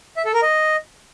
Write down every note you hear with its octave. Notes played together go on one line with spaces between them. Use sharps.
E5
A4
A#4
D#5